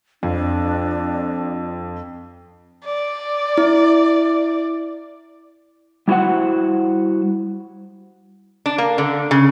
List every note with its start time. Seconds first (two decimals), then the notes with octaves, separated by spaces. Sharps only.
0.23 F2 D4
2.85 D5
3.58 E4
6.08 G3 E4 F#4 C5 F#5
8.66 D4
8.78 A#3
8.98 D3
9.31 C#3